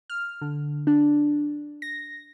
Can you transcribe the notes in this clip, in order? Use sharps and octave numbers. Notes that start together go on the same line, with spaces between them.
F6
D3
D4
A#6